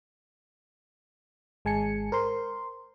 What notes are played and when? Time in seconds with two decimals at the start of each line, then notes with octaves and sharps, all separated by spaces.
1.65 G#1 G#3 G#5 A5 C#7
2.12 A#4 C5 C6